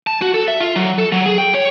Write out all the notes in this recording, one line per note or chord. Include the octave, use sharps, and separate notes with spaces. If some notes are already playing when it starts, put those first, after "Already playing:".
A5
F#4
A4
E5
F4
F#3
A4
F#3
G#4
G5
C#5